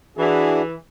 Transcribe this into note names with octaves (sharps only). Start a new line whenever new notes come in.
E3 D4 E4 F#4 G#4